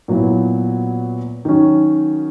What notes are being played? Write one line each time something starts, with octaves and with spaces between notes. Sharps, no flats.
A#2 F#3 B3 E4
D#3 F#3 C#4